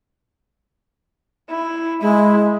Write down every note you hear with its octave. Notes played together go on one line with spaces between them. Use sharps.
E4
G#3 E4